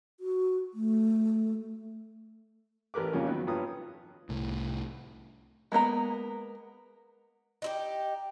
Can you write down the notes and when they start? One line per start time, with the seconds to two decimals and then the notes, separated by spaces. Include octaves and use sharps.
0.20 F#4
0.74 A3
2.94 A1 G4 A#4 B4 D6
3.13 F2 A#2 C#3 F3 G3 C#4
3.27 D#3 F#3 B3
3.47 G2 F4 B4 C#5 A#5 D#6
4.29 C2 A2
5.72 G#3 A#3 B3 A#5
7.62 D#4 E4 G4